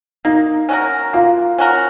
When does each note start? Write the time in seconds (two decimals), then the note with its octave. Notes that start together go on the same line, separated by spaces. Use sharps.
0.25 A#3 D#4
0.69 C#4 F#4 A#4
1.13 A#3 F4
1.58 C#4 F#4 A#4